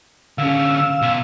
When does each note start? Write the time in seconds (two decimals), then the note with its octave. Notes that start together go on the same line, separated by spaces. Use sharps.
0.38 D3 C#4 F5 E6
1.01 B2 C6